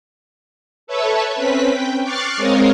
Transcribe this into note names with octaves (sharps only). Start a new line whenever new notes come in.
A4 B4 C#5 E5 A5
C4 C#4 B4 B6
G5
C#6 D6 F6 F#6 A6 C7
G#3 C4 A#4 C#5 D#5 F5